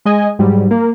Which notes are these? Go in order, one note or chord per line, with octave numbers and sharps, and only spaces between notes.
G#3 D#5 G#5
G#2 F#3 G3
A#3